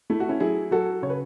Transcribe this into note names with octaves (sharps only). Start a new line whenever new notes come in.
A3 E4
F#4
C#4 E4
F#3 E4 G#4
F#3 F#4 A4
C#3 C#5
B4